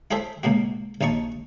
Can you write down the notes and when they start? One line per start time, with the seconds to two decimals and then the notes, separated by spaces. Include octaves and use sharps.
0.11 E4 G#4 A4 C5 E5
0.43 C#2 B2 A#3 F#4
1.01 A#1 D#2 D#4 A5 C#6